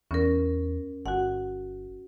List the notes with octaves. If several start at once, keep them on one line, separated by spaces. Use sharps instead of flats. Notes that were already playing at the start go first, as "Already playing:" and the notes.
E2 C#4 A#4
G1 F#4 F#5